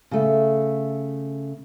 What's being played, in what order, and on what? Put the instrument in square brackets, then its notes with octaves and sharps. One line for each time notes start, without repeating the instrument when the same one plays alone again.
[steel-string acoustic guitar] C#3 A3